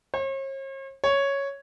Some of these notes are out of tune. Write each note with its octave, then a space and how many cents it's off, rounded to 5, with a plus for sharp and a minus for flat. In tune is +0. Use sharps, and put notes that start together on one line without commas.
C#5 -45
C#5 +0